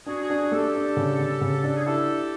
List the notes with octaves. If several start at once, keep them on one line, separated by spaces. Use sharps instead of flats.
D4 F#4 G#4
F#4 G#4
D4
F#4 G#4
A3 G4 A4
D4
C#3
C#3
C#3
D4
G#4
E4 G4 A4
E4